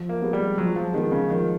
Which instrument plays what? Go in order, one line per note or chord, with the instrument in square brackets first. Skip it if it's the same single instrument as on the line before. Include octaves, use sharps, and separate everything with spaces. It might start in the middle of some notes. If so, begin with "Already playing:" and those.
Already playing: [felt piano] F3
[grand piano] A#3
[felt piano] G#3 B3
[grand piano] G3
[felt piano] F3 [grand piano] F#3
[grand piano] F3
[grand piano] D#3 [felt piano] G#3 B3
[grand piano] C#3
[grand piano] D#3 [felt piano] F3